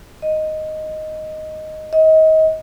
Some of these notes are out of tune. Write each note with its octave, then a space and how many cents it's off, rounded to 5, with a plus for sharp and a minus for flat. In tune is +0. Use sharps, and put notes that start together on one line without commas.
D#5 +0
D#5 +30